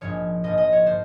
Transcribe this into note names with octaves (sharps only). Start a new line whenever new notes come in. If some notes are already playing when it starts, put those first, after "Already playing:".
A#1 G#2 F3 C#5
A#1 G#2 F3 D#5
D#5
C#5
F3 C5